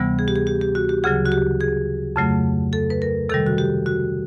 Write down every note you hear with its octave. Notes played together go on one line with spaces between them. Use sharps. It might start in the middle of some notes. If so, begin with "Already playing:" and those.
Already playing: D2 C3 E3 G3 B3
G#4
G4
G#4
G4
G4
F#4
G4
D2 C#3 F#3 G#4
F#4
G4
G#4
F2 C#3 F#3 A3
A4
B4
A#4
C3 D#3 G3 A4
F#4
G4
F#4